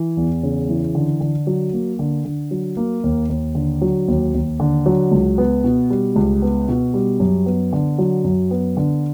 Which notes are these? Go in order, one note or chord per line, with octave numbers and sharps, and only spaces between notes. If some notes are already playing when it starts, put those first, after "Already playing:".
Already playing: E3
E2
C#3
E3
D3
D3
F#3
A#3
D3
D3
F#3
A#3
D#2
D#2
D3
F#3
D#2
D#2
D3
F#3
C#2
B3
B2
G3
C#2
B3
B2
G3
F#2
B3
D3
F#3
F#2
B3
D3